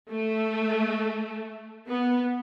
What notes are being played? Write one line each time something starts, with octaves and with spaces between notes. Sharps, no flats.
A3
B3